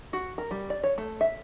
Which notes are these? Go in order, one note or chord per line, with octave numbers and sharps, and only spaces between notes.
F#4
A#4
G3
D5
C#5
A3
E5